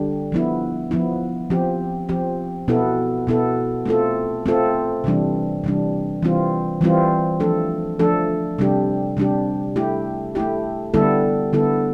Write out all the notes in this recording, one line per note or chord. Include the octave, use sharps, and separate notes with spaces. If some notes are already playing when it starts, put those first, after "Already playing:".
Already playing: D3 G3 D4 G4
F3 B3 E4
F3 B3 E4
F3 C4 G4
F3 C4 G4
B2 B3 E4 A4
B2 B3 E4 A4
A3 C4 F4 A4
A3 C4 F4 A4
C3 E3 G3 D4
C3 E3 G3 D4
E3 G3 C4 F4
E3 G3 C4 F4
F3 A3 D4 A4
F3 A3 D4 A4
C3 G3 D4 G4
C3 G3 D4 G4
A3 E4 G4
A3 E4 G4
D3 G3 B3 E4 A4
D3 G3 B3 E4 A4